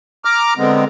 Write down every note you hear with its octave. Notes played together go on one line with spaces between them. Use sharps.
A#5 D6 F6
D3 G#3 B3 C4